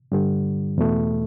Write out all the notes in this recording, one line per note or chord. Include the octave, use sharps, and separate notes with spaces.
G2 D3 G3
E2 B2 A3